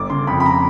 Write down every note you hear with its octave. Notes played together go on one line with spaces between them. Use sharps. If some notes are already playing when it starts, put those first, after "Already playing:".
Already playing: G1 D6
C#3 C6
F2 B5
B5
A#5